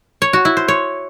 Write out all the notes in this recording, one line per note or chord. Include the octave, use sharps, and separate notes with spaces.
C#5
F#4
E4
C5
C#5